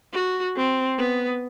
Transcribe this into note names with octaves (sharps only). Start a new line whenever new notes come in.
F#4
C4
B3